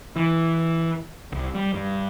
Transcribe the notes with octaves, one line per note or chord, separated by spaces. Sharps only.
E3
C2
G3
G2